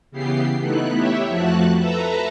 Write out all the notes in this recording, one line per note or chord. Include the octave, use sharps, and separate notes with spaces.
C#3 E3 B3 G4 C7
A3 B3 D#4 E4 F#6
E4 G4 C#5 E5
F2 F3 A3 F#4 A5 F#6
A4 B4 E5 A5 A#5